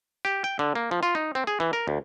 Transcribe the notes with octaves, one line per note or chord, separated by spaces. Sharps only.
G4
G5
D3
A#3
F3
F4
D#4
C4
G#4
E3
A#4
D2